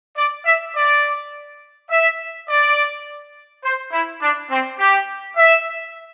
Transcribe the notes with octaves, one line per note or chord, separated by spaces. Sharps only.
D5
E5
D5
E5
D5
C5
E4
D4
C4
G4
E5